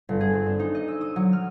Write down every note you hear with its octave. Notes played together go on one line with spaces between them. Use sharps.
G1
G#4
C4
D4
D#4
D#5
E6
D#6
F#3
F6